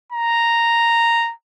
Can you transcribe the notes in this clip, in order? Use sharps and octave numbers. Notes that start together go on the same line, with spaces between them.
A#5